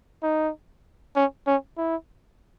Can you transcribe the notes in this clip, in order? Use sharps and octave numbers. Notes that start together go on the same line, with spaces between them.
D#4
C#4
C#4
E4